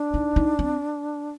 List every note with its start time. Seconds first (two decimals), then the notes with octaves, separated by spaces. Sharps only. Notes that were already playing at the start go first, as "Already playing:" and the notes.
Already playing: D4
0.14 D#4
0.36 D#4
0.59 C4